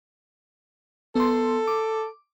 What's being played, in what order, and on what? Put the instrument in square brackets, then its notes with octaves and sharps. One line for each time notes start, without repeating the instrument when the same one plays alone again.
[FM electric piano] B3 C6 [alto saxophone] A4
[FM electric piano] D6